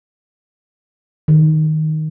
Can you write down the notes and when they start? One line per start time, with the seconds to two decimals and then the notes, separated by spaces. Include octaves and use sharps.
1.28 D#3